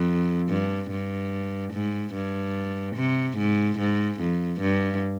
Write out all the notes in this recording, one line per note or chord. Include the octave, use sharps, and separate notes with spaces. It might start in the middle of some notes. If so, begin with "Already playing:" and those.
Already playing: F2
G2
G2
G#2
G2
C3
G#2
G#2
F2
G2